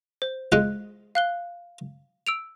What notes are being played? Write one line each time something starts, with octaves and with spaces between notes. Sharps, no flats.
C5
G#3 F4 F#6
F5 F#6 G7
E6 D7 F7